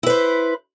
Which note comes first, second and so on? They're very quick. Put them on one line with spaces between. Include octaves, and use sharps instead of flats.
E4 B4 C5